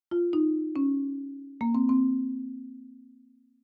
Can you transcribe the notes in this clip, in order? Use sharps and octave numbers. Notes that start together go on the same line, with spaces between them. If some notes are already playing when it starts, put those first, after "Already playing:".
F4
D#4
C#4
A#3
C4
C4